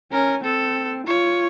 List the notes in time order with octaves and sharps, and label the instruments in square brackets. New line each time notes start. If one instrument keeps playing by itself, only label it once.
[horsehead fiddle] C#4 [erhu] A#4
[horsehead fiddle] C4 [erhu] A4
[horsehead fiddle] F4 [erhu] C#5